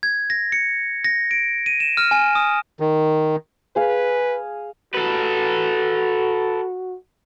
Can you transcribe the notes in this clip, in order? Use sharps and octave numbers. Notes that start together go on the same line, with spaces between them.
G#6
A#6
C#7
A#6
D7
D#7
E7
F6
G#5
D#6
D#3
G#4 B4 F5
F#4 A4 B4